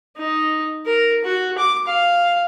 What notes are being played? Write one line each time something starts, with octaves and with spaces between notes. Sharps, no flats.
D#4
A#4
F#4
D6
F5